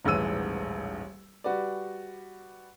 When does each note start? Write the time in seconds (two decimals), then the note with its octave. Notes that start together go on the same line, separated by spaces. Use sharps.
0.05 D#1 A1 G#2 E3 E6 D#7
1.44 G3 F#4 B4 D5